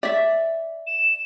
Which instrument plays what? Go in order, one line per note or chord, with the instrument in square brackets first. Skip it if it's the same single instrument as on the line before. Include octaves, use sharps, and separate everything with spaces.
[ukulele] D5 E5
[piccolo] E7